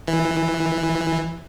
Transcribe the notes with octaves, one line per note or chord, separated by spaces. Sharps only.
E3